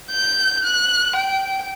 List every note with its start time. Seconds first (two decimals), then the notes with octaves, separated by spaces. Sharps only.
0.11 G6
0.64 F#6
1.15 G5